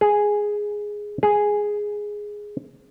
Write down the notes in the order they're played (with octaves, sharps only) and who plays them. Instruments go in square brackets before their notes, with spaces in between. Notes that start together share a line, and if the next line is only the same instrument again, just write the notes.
[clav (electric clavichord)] G#4
G#4